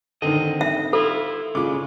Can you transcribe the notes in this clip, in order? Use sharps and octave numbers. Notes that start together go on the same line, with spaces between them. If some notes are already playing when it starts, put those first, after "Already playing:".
D3 D#3 C4 D#5
E5
E4 F4 A4
C#3 G#3 F4 D6